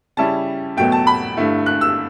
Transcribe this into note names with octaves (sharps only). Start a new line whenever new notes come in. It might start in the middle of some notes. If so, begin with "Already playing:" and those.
C#3 G3 C#4 E4 A5
E2 B2 F#3 A3 G5
A5
B5
G2 D3 A3 E4
F#6
E6